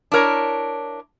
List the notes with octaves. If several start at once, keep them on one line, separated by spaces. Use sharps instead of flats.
D4 E4 A#4 C#5